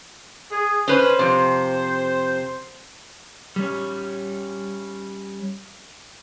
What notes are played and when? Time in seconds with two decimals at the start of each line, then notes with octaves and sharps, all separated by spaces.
0.51 G#4
0.88 C#4 B4 C5
1.19 F2 C3
3.56 G3 C#4